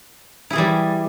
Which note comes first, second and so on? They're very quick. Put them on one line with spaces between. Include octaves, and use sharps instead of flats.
E4 G#4 E3 G3